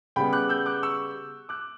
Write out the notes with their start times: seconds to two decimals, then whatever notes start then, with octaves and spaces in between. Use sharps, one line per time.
0.16 C#3 G3 B3 G5 B5
0.33 D6 F#6
0.49 E6 G6
0.66 D6 F#6
0.83 C#6 E6
1.49 D6 F#6